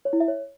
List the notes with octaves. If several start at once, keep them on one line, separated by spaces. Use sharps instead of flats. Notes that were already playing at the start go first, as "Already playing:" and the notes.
C#5
E4
E5
C#5